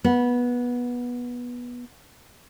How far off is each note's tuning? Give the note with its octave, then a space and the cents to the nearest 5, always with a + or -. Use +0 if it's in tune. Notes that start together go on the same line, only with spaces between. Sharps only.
B3 -15